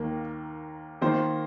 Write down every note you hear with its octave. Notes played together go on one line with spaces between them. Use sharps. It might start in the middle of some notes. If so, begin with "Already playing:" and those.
Already playing: D#2 D#3 A#3
D#3 A#3 F4 C5